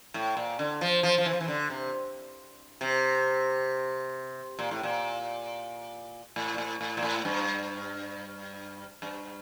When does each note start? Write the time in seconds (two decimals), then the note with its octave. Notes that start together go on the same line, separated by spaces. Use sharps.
0.14 A2
0.37 A#2
0.59 D3
0.81 F3
1.03 F3
1.18 F3
1.26 E3
1.33 F3
1.41 E3
1.48 D3
1.70 C3
2.81 C3
4.59 A#2
4.71 A2
4.83 A#2
6.36 A2
6.54 A#2
6.58 A2
6.81 A2
6.97 A#2
7.02 A2
7.25 G2
9.02 G2